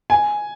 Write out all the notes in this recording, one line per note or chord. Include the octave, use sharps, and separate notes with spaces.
G#5